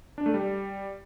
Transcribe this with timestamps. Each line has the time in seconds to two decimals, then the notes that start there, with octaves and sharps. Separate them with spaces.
0.18 D4
0.26 A3
0.34 G3